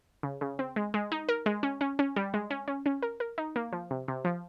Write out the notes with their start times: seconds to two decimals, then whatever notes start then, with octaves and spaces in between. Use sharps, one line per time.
0.23 C#3
0.41 C#3
0.59 C4
0.76 G#3
0.94 G#3
1.12 D#4
1.29 A#4
1.46 G#3
1.63 C#4
1.81 C#4
1.99 C#4
2.16 G3
2.34 G#3
2.50 C#4
2.68 C#4
2.86 C#4
3.02 A#4
3.20 A#4
3.38 D#4
3.56 A#3
3.72 F3
3.91 C3
4.08 C3
4.25 F3